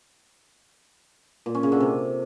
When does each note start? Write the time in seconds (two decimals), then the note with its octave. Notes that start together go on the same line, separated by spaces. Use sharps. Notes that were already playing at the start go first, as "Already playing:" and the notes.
1.46 A#2
1.55 C#4
1.63 C#3
1.72 D3
1.80 C3